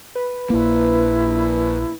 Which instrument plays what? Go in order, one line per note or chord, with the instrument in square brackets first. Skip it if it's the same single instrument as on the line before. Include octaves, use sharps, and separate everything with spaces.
[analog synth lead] B4
[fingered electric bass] A#1 A#3 [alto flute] E4